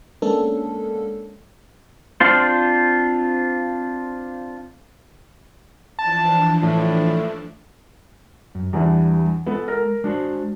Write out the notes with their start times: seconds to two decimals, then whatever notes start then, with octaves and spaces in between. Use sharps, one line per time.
0.22 G#3 A#3 B3 C#4 D4 A4
2.20 C4 D4 F4 C5
5.99 E3 F3 D4 A5
6.63 A2
8.55 F#2
8.73 E2 E3 G3 D4
9.47 G#3 B3 A4
9.68 A#4
10.04 G#3 D4 F#4 C5